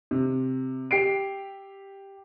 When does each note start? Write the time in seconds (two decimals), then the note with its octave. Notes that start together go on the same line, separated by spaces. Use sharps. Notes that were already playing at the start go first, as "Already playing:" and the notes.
0.11 C3
0.91 G4 C7 D7